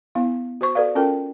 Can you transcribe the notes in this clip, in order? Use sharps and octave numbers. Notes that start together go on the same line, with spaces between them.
B3 E4 F5
F#4 C5 C#6
F#4 A4 B4 D5 F5
C#4 F4 A4 A#4 G5